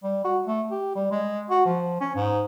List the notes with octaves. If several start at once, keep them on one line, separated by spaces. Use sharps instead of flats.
G3
F#4
A3
G4
G3
G#3
F#4
F3
C#4
G#2